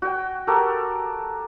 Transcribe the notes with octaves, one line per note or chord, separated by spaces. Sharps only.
F#4 G5
F#4 G4 A4 A#4